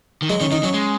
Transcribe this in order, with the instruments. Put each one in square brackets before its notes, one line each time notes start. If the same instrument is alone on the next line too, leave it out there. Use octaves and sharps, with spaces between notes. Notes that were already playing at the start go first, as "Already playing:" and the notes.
[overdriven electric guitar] D#3
[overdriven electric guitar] F#3 [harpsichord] G#3
[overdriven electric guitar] D#3 [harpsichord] C#4
[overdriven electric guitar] D#3 [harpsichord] D#4
[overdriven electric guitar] F#3 [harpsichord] C#4
[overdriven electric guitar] G#3